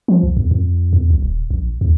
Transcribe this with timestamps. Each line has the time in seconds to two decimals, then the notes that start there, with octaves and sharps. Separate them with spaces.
0.08 F3
0.23 B1
0.37 E2
0.51 F2
0.93 E2
1.10 C2
1.22 D#1
1.51 A#1
1.81 D#2